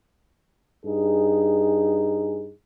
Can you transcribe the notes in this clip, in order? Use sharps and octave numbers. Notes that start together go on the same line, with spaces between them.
G2 D#4 G#4